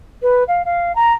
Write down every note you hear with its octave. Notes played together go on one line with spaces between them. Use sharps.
B4
F5
F5
A#5